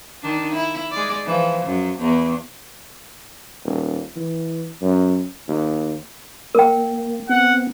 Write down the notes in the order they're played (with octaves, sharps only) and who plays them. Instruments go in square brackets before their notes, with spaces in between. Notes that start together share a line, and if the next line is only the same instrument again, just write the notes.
[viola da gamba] D#3 D4
E4
G#3 D5
E3 F3
F#2
E2
[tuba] D#1
E3
F#2
D#2
[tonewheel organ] A#3 [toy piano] A#4 G5
[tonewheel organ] B3 C4 [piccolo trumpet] F#5